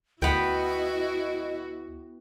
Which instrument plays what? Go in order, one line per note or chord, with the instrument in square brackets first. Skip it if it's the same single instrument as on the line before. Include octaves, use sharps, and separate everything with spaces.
[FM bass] D2 [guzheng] B3 G5 [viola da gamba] E4 F#4 [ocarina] D#5